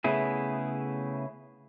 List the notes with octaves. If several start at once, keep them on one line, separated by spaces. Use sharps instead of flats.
C#3 A3 B3 E4 G#4